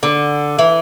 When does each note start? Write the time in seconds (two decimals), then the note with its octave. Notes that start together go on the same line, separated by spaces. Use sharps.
0.03 D3
0.59 E3